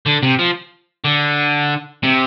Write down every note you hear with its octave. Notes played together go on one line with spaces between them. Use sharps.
D3
C3
F3
D3
C3